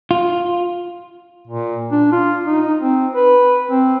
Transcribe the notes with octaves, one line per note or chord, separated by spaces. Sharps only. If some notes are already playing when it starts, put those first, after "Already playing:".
F4
A#2
D4
F4
D#4
C4
B4
C4